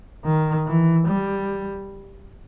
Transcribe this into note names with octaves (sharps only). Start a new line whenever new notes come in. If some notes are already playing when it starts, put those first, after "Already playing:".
D#3
E3
G3